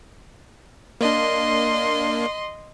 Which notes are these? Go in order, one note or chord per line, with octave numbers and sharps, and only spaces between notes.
A#3 D4 D#5 C6